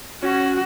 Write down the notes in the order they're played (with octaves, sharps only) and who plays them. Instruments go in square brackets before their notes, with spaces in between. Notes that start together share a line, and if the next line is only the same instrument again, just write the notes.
[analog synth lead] C#4 [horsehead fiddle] F#4